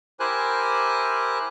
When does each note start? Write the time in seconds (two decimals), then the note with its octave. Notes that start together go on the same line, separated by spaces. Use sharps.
0.20 E4 G4 A#4 C5 G#5 F#6